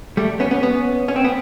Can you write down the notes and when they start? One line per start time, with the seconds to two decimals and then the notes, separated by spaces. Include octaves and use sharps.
0.17 G3 A3
0.40 B3 C#4
0.51 B3 C#4
0.63 B3 C#4
1.08 C#4
1.16 C4
1.25 B3